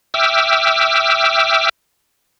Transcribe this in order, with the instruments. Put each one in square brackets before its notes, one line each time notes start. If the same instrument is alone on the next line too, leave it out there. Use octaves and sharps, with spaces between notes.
[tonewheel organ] E5 G5 D6 E6 F6